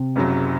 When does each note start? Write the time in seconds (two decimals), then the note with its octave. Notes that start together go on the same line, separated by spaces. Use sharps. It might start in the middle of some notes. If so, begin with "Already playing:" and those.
Already playing: C3
0.16 F#1 F#2 C#3 F#3